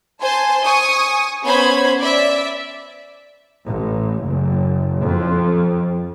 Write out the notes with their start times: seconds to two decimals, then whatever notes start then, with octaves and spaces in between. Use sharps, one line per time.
0.21 C5 G#5 A5 C6
0.64 G#5 C#6 D#6
1.43 B3 C#4 C5 B5 G#6
1.99 D5 E5
3.66 A1
4.23 F#1
5.03 F2